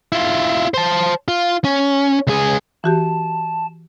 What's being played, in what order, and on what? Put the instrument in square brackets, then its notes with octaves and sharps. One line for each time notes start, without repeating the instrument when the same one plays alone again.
[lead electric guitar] E4 F4
C5 A5
F4
C#4
C#2 G#4
[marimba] E3 F#4 G4 [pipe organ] A5